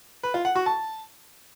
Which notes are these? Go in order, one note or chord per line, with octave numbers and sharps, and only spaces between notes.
B4
F4
F#5
F#4
A5